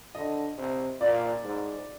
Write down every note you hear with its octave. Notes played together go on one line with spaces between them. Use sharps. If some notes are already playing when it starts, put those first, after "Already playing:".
D3 D#5
C3
A#2 D5
G#2